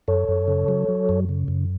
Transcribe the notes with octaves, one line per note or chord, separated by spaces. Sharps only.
F#2 A4 C#5
F#2
C#3
F#3
F#3
F#2
C#3
F#2